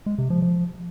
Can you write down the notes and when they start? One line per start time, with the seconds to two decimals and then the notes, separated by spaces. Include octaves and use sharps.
0.06 G#3
0.18 C3
0.30 F3
0.42 F3